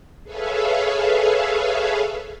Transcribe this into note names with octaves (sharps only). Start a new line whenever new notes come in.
G#4 A4 B4 C#5 E5 F5